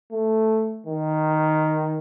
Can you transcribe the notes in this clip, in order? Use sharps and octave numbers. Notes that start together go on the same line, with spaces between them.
A3
D#3